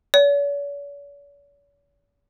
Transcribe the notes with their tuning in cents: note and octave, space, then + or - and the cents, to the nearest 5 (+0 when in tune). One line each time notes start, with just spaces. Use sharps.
C#5 +45